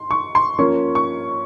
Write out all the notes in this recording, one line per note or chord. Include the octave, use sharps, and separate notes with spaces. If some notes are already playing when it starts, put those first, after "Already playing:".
Already playing: C6
C#6
C6
F3 A#3 C#4 C#6
C#6